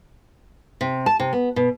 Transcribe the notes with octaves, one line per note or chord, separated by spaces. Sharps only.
C3
A5
C3
B3
B2